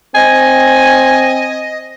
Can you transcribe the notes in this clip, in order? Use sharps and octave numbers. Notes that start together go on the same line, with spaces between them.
C4 D#5 G#5